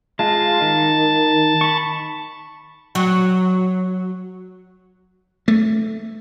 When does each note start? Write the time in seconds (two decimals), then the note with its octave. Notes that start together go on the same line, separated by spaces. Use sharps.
0.19 G#3 F4 A5
0.62 D#3
1.61 B5 C#6
2.95 F#3
5.48 A3